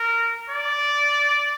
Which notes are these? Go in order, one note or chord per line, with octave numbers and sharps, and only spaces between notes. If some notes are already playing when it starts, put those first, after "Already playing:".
Already playing: A#4
D5